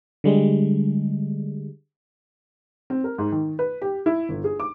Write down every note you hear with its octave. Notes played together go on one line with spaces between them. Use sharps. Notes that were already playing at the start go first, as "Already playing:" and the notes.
D3 G3 G#3
C4
A#4
G#2
D#3
B4
G4
E4
G1
G#4
D6